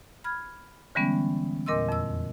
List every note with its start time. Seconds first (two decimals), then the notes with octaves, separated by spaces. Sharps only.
0.24 B5 F6 G#6
0.95 D3 E3 G3 G#3 B3 C#4
1.66 E2 A#2 A#4 D#5 C6 E6
1.89 F2 E6